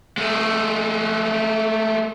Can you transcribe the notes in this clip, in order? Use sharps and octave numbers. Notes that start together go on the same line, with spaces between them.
G#3 A3